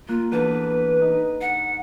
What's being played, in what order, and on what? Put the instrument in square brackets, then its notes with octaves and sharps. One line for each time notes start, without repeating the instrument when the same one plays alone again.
[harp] A#3 F#6 [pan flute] F4
[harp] E2 D4 A4 [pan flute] B4
[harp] D#4
[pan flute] F#5